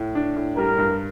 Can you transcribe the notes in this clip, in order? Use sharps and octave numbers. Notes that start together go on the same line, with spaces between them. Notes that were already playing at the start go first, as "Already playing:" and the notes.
Already playing: A2
D4
A2
G3 A#4
G2